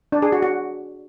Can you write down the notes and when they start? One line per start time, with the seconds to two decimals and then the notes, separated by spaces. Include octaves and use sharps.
0.12 D4
0.22 G#4
0.32 F#4
0.42 F#4